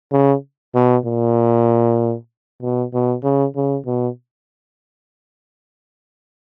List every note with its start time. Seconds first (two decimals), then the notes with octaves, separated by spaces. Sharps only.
0.12 C#3
0.75 B2
1.06 A#2
2.62 B2
2.93 B2
3.23 C#3
3.56 C#3
3.86 B2